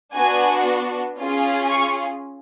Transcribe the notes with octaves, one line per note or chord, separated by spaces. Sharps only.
B3 D4 F#4 G#5
C#4 F4 G#4
C#6